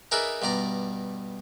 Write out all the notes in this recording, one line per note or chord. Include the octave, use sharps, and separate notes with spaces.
D#4 G#4 A#4 B4 D5 E5
G2 B2 D5 A#5